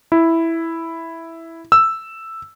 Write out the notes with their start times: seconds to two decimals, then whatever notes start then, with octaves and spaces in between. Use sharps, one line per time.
0.12 E4
1.72 E6